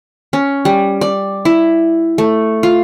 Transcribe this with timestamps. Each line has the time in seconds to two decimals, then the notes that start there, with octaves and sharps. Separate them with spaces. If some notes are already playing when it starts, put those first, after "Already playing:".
0.33 C#4
0.65 G3
1.01 D5
1.45 E4
2.18 A3
2.63 F4